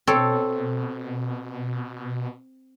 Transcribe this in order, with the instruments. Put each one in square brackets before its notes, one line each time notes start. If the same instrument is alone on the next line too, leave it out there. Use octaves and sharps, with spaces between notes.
[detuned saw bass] B2 [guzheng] C4 A4 C#5